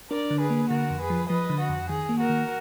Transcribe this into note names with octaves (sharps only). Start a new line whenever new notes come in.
D4 A#4 D5
D3
G#4 B4
A#3
D3 F#4 A#4
F2
G#4 B4
F3
F3 B4 D#5
D3
F#4
F2
D#3 G#4
A#3
F#4 A#4
D#3